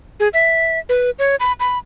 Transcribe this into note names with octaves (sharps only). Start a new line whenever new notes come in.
G#4
E5
B4
C#5
B5
B5